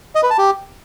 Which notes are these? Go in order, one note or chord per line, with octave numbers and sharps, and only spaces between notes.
D#5
B4
A5
G4